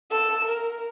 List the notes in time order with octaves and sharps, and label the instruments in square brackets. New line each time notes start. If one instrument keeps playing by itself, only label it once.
[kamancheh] A4 E6
A#4